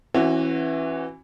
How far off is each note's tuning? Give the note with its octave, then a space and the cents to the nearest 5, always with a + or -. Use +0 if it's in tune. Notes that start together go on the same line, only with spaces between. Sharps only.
E3 +0 C#4 -40 F#4 +0